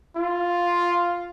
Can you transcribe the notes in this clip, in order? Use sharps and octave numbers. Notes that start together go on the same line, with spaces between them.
F4